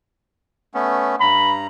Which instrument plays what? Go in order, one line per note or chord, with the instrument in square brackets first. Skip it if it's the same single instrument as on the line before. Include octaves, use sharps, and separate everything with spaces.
[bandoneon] A3 B3 C#4
[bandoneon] G2 A#5 [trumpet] B5